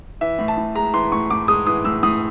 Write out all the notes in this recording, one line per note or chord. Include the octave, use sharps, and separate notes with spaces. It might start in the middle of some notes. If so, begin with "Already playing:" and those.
E3 E5
A2
A5
A2
G#3 A#5
E3 C6
A2 C#6
A2 D6
G#3 D#6
E3 D#6
A2 E6
A2 D#6